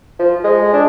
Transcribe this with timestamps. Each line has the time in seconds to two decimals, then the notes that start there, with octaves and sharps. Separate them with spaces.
0.19 F3
0.44 G#3
0.73 D4